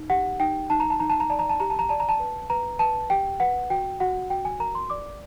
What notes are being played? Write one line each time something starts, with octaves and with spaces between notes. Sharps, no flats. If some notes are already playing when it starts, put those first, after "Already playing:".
Already playing: D#4
G4 F#5
D#4 G5
D#4 A5
A#5
A5
D#4 A#5
A5
A#5
D5 A5
A#5
A5
G4 A#5
A5
A#5
D5 A5
A#5
A5
B4
B4 A#5
B4 A5
G4 G5
B4 F#5
F#4 G5
F#4 F#5
F#4 G5
G#5
A#4 A#5
C6
D5 D6